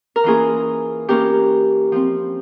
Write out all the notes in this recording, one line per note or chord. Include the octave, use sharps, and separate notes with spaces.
A#4
E3 A#3 C#4 F4 G#4
E3 A#3 C#4 G4 A#4
F3 C4